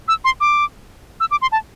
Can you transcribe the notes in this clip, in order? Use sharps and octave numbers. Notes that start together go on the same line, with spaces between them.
E6
C6
D6
E6
D6
C6
A5